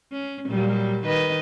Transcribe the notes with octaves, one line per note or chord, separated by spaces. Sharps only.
C#4
A#2 F#3 G3
D#3 B4 D#5